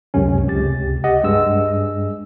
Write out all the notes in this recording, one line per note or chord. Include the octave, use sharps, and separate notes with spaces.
C#2 F#2 C3 C#4
C#2 C3 G4 A6
G4 D#5 F#5
G2 G#3 E6